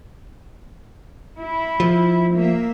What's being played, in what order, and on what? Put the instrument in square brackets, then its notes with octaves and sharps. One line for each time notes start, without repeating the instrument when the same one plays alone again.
[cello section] E4
[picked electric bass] F3
[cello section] A#3 E5